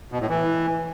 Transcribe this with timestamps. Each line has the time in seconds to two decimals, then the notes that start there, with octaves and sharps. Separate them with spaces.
0.12 B2
0.21 A2
0.29 E3